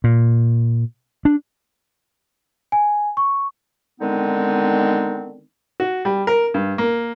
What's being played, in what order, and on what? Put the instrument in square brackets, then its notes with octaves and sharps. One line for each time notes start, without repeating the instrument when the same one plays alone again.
[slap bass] A#2
D4
[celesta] G#5
C#6
[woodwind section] D3 D#3 G#3 B3 C4 D#4
[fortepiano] F#4
G3
A#4
G2
A#3